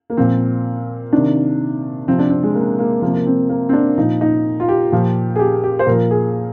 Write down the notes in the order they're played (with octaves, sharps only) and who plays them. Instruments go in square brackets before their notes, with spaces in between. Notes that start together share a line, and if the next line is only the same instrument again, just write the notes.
[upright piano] A#3
A#2 F3 C4
C3 D#3 D4
C3 F3 C4
D4
C4
G#3
A#3
A#3
C3 F3 A#3
A#3
C4
A#3
C4
D4
A#2 F3 D#4
D#4
F4
G4
A#2 F3
G#4
G4
G4
C5
A#2 F3 A#4
G#4